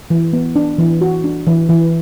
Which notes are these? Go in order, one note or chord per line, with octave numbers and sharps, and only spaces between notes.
E3
B3
D4
E3
F#4
D4
E3
E3